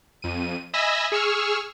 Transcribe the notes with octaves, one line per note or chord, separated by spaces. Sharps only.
F2 D#7
D#5 E5 G#5 B5 E6 A#6
G#4 C#6 E6 F6